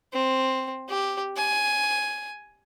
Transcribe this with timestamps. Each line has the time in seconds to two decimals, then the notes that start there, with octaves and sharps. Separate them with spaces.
0.13 C4
0.89 G4
1.37 G#5